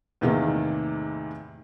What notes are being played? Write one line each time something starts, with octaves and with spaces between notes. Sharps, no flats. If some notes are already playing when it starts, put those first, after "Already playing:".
E2 A2 C3 D#3 A#3 D#4